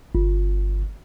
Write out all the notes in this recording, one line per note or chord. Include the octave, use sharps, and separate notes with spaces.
G1